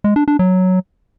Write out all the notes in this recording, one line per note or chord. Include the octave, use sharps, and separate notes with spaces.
G#3
D4
D4
F#3